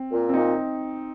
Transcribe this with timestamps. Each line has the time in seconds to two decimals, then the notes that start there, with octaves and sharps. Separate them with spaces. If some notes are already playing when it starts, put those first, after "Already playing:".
Already playing: C4
0.11 A#2
0.29 C4
0.34 A#2 D#4